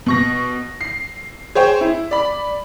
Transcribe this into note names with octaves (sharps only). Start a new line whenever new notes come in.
B2 C#6 A#6
C7
G#4 C5 C#5 G5
E4
D5 B5